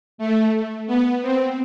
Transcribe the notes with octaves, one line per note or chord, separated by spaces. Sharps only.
A3
B3
C4